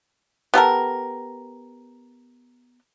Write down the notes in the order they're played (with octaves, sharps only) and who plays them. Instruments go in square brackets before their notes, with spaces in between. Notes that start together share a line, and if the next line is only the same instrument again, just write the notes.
[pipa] B3 G4 A4 A#4